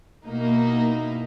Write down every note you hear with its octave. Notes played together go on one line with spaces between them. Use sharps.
B2 A#3 D#4 E4